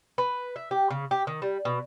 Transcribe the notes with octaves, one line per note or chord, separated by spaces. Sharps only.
B4
E5
G4
C#3
G4
D#3
G3
B2